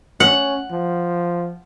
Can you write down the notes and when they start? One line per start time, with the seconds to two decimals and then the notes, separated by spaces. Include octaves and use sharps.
0.20 C#4 F#5
0.71 F3